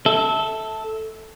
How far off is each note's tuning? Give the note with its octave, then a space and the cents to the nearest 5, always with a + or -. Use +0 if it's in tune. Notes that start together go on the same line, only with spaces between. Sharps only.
A4 +0 E5 -15